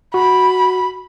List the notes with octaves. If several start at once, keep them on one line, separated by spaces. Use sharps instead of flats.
F#4 B5